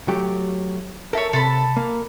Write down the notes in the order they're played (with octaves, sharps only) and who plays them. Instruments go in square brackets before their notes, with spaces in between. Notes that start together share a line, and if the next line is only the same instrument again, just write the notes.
[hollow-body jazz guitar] F#3 A3 G4
[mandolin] A4 C#5 [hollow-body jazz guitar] A#4 E5
[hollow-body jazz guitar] C3 [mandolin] A4 A5 B5
[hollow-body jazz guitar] A#3